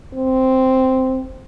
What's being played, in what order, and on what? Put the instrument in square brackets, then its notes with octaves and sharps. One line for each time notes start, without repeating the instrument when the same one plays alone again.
[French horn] C4